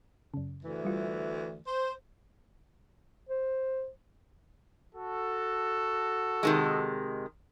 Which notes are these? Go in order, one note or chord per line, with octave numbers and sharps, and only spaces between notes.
F#2 C#3
D2 E3
G3 F4
C5
C5
F#4 A4
C3 D#3 G#3